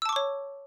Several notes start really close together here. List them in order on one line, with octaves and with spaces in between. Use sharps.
E6 A5 D6 C#6 C#5